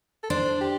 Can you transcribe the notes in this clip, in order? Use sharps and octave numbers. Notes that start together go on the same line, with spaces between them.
A4
D4 C5
G4